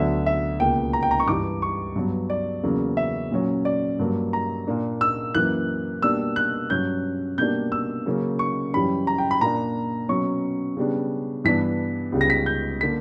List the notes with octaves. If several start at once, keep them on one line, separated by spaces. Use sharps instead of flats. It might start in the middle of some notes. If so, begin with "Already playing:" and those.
Already playing: D2 D3 F#3 B3 D4 E5
E5
C#2 B2 A#3 G5
A#5
G5
A#5
C#6
G2 E3 G3 D6
C#6
G2 F#3 B3
D5
E2 C#3 F#3 A#3
E5
A#2 F#3 C#4
D5
G2 F#3 A#3
A#5
A#2 A#3 D4
E6
F#2 E3 A#3 F#6
B2 G3 A#3 D4 E6
F#6
G2 F#3 C#4 G6
B2 G3 A#3 D4 G6
E6
C#3 F#3 A#3 C#4
C#6
F#2 E3 G3 C#4 B5
A#5
G5
B5
A#2 A#3 D4 A#5
B2 F#3 C#4 C#6
C#3 G3 B3 D4
G2 E3 B3 D4 B6
C#2 C#3 G3 B3
A#6
B6
G6
D3 A#3 B6